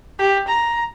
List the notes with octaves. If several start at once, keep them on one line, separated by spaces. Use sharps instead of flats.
G4
A#5